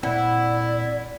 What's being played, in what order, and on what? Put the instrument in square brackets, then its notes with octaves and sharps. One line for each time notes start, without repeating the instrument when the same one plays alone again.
[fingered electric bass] A#2 C4 [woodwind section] E4 [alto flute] D5 [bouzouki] F#5